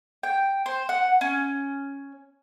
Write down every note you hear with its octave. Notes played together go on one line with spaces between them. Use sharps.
G5
C5
F#5
C#4